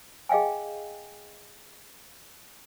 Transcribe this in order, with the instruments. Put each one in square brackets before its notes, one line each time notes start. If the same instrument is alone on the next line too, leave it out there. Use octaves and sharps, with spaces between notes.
[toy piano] G#4 D#5 F5 G5 G#5